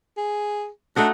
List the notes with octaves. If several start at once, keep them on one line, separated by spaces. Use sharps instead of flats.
G#4
A3 D4 D#4 F#4